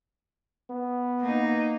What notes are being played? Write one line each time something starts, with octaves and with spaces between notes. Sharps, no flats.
B3
A#3 D#4